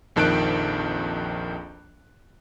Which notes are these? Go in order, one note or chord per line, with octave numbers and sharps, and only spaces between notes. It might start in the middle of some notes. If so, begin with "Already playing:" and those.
A#1 F2 D#3 A5 F#6 D7